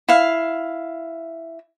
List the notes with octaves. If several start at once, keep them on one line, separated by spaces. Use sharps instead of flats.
E4 F5